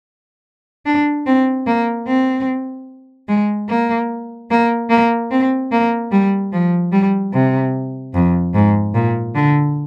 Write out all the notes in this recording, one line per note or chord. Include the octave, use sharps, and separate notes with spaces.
D4
C4
A#3
C4
G#3
A#3
A#3
A#3
C4
A#3
G3
F3
G3
C3
F2
G#2
A#2
D3